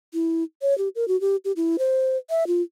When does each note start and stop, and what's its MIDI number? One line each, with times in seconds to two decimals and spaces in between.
0.14 0.43 64
0.62 0.76 73
0.78 0.88 67
0.95 1.07 70
1.08 1.19 66
1.21 1.36 67
1.45 1.52 67
1.56 1.76 64
1.79 2.17 72
2.30 2.47 76
2.47 2.62 65